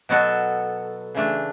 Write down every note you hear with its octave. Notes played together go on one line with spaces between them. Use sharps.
B2 F#3 B3 F#4 A4
C#3 E3 A3 D4